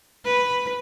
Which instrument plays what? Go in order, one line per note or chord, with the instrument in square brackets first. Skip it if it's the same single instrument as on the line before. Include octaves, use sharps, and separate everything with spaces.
[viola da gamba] B4